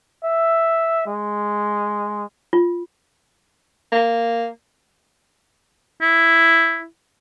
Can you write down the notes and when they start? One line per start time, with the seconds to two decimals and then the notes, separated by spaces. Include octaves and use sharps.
0.24 E5
1.07 G#3
2.53 F4
3.92 A#3
6.02 E4